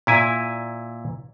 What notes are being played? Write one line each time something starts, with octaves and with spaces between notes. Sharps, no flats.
A#2 E4 G#5